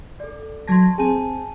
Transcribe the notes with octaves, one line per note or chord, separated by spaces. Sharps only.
A4 D5
F#3 A5 C6 G#6 A#6
C4 G#4 G#5 A5 D#7